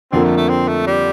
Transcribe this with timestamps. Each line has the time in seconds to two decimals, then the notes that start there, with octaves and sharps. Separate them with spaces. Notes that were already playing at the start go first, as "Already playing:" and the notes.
0.12 F2 D3 F3 A#3 C4
0.24 A3
0.37 A3
0.49 C4
0.68 A3
0.87 G3